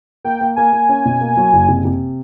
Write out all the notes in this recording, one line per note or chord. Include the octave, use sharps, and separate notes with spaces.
A#3 G5
A#3
A#3 G#5
A#3
C#4
B2
A#3
F#3
F#1
C3
C3